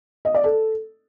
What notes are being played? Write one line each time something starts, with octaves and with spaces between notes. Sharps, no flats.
D#5
D5
A4